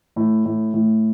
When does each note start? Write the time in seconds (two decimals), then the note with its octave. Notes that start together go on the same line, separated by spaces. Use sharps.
0.16 A2
0.45 A2
0.74 A2